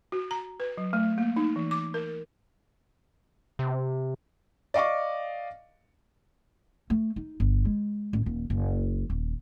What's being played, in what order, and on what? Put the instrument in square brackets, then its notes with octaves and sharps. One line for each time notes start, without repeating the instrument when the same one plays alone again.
[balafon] F#4
A#5
B4
F#3
A3
A#3
D#4
E3
D6
A#4
[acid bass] C3
[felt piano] D5 D#5 F5 C#6 D6
[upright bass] A3
D#4
G1
G#3
A1
D#1
F#1
D#1